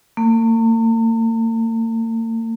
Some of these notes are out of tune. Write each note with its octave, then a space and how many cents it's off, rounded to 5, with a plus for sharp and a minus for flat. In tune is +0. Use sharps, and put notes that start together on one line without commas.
A#3 -45